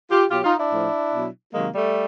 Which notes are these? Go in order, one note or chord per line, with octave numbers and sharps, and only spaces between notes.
F4 G4
B2 F#3 F4 G4
D#4 F4
D4 E4
A2 F3
B2 F#3
C3 D#3 F#3 G#3 A#3
G3 A3